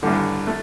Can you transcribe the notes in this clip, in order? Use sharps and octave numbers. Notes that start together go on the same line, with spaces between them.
A1 G2 D3
A3